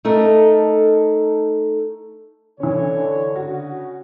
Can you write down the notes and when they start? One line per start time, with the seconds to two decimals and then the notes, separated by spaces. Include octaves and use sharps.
0.05 A3 D#4 A4 A#4
2.60 D3 E3 C#4 E4 C#5
3.35 C#3 F#4